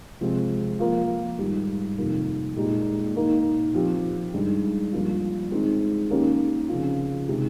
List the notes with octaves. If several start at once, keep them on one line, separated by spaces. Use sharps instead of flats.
C3 F3 G#3 C4
F3 A#3 F4
G#2 D#3 G3
F2 C3 D#3 A#3
A#2 G#3 D#4 G4
D#3 A#3 D#4
F3 C4 G4
G2 D#3 G#3
G2 F3 A#3 F4
D#3 G#3 C4
D#3 A#3 C#4 G4
C#3 F3 C4 F4
C3 D#3 G#3